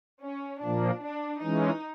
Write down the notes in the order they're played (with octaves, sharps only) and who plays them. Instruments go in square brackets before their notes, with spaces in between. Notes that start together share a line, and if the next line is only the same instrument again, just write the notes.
[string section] C#4
[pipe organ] A#2 F3 A#3 [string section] D4
[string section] D4
[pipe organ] E3 G#3 C#4 [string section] D#4